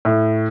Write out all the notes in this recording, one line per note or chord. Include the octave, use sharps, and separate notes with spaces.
A2